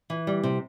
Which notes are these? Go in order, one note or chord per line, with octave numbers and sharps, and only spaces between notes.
E3
G3
C3